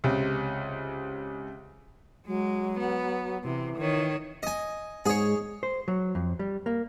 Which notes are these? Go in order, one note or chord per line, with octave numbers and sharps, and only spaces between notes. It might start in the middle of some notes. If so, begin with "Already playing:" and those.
C#2 C3
F#3 G#3
B3
C3 E3
D#3 C#5
D#5 G#5
G#2 G#4 C#5
C5
F#3
F2
G3
A#3